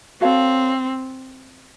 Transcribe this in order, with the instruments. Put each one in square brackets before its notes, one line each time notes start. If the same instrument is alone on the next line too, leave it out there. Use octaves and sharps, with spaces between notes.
[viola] C4 [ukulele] F#4 A4 C#5 F5